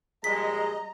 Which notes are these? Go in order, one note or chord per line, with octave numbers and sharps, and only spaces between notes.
A#1 G3 G#3 D#5 A#5 B6